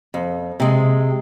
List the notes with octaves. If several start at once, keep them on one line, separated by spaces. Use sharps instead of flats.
F2
C3 G#3